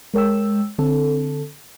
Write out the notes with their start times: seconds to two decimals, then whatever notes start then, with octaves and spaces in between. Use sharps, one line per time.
0.14 G#3 A#4 C#5 G5 E6
0.79 D3 C4 A4